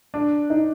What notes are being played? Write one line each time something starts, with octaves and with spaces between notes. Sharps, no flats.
D4
D#4